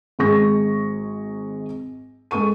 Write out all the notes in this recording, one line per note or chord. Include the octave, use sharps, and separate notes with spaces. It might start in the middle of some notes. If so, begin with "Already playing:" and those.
G#1 G#3 G#4 C#6 A#6
G#3 A4 C#6 D#7